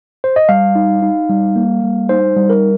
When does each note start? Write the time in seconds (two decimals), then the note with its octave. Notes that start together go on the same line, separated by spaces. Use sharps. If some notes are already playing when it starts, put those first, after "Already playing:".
0.24 C5
0.36 D#5
0.49 G3 F5
0.75 D#4
1.02 D#4
1.29 G3
1.56 A#3
1.83 G3
2.09 D#4 C5
2.36 G3
2.50 A#4